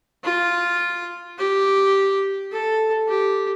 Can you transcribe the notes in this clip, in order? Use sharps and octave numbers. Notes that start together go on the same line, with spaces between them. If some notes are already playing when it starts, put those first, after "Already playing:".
F4
G4
A4
G4